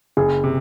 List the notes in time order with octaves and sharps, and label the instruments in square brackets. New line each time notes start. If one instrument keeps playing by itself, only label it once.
[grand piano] F#1 [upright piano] G#4
[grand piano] C3